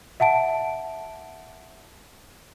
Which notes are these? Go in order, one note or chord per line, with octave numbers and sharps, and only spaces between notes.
E5 F#5 A5 D7